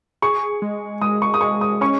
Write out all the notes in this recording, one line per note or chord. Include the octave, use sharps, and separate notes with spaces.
G#4 C#6
G#3
G#3 D#6
C#6
D#6
G#3 C#6
D#6
C#4 C#6